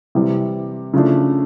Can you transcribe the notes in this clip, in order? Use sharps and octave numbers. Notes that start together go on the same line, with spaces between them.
C3 E3 G3
C#3 F3 A3 D4